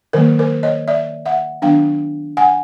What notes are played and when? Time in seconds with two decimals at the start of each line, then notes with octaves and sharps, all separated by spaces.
0.13 D#3 F#3 A#3 A#4 C5
0.39 A#4 C5
0.63 C#5 D#5
0.88 D5 E5
1.26 E5 F#5
1.62 D#3 F#3 B3 D4 F5 G5
2.37 F#5 G#5